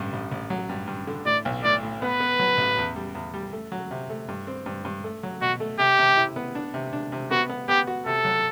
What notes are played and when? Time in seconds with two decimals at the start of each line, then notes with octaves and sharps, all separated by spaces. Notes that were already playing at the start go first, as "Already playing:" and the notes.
Already playing: A1 G2
0.13 A1
0.32 A1
0.50 F#3
0.69 G2
0.87 G2
1.07 D3
1.26 A2 D5
1.45 B1
1.64 A2 D5
1.83 A2
2.01 B3 B4
2.20 B3
2.39 F#3
2.58 A1
2.78 E2
2.96 G3
3.15 E2
3.34 G3
3.52 A3
3.72 F#3
3.91 C3
4.10 A3
4.28 G2
4.47 C4
4.66 G2
4.85 G2
5.04 A3
5.23 F#3
5.41 B2 F#4
5.60 A3
5.79 C3 G4
5.99 C3
6.17 E4
6.36 B3
6.55 D4
6.74 C3
6.93 D4
7.12 C3
7.31 B3 F#4
7.50 B3
7.69 B3 G4
7.87 F#4
8.06 C3 A4
8.25 F#3